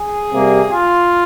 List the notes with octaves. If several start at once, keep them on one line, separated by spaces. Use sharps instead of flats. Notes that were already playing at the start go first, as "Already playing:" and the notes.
Already playing: G#4
C3 G3 A#3
F4